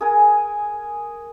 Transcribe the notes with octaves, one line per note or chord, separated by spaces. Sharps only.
G#4 A#4 G#5